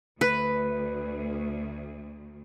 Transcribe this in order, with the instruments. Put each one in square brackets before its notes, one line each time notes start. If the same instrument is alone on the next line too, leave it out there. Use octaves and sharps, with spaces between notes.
[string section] D2 [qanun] B4